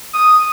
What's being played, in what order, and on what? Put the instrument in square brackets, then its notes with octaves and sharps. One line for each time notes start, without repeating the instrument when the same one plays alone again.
[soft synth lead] D#6